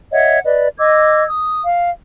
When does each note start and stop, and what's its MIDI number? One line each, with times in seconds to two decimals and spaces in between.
0.12 0.39 73
0.12 0.39 75
0.12 0.39 76
0.12 0.39 78
0.45 0.69 71
0.45 0.69 74
0.45 0.69 75
0.78 1.24 75
0.78 1.24 86
0.78 1.24 88
0.78 1.24 92
1.28 1.60 87
1.65 1.90 77